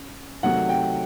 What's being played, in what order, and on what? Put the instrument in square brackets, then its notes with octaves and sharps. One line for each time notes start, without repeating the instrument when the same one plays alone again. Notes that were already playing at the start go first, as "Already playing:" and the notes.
Already playing: [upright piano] C#4
C3 D#3 F#3 A3 F#5
G5